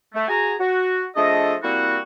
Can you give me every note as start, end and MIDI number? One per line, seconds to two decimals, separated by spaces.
0.14 0.27 57
0.28 0.54 66
0.28 0.54 68
0.28 0.54 80
0.28 0.54 82
0.60 1.06 66
1.16 1.55 53
1.16 1.55 57
1.16 1.55 62
1.16 1.55 68
1.16 1.55 69
1.16 1.55 75
1.63 1.99 55
1.63 1.99 58
1.63 1.99 60
1.63 1.99 64
1.63 1.99 66